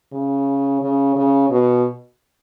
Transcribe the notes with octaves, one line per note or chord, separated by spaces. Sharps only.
C#3
C#3
C#3
B2